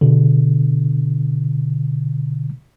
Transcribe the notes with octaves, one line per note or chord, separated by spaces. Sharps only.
B2 D3